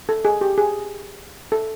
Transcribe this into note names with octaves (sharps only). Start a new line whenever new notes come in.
A4
G#4
G4
G#4
A4